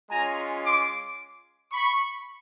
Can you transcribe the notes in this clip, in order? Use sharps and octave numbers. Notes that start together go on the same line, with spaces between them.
G#3 C#4 F4 G#5 A#5
C6 D6
B5 C#6